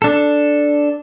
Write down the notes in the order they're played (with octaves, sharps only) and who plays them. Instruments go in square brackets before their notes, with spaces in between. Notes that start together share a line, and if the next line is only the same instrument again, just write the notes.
[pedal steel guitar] D4 A4